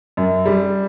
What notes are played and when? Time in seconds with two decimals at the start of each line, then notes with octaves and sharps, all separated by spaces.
0.17 F#2
0.46 G3